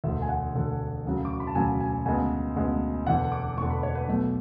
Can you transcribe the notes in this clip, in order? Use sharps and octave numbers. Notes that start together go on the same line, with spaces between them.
E1 D2 D3 E5
G#5
F#5
E1 D2 D3
E1 D2 C#3 F#3
D6
C#6
B5
A5
E1 D2 C#3 F#3 G#5
G#5
D2 C#3 G#3 B3 G#5
D2 C#3 G#3 B3
E1 E2 D3 F#5
D6
E1 E2 D3 C#6
B5
C#5
B4
B1 B2 A3